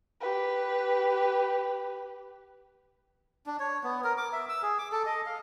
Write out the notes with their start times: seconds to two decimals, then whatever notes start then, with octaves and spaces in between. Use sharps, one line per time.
0.20 G4 B4
3.46 D4
3.60 C#5
3.84 B3
4.04 A#4
4.18 D6
4.33 E5
4.49 E6
4.62 G#4
4.79 D6
4.92 A4
5.06 D#5
5.26 F5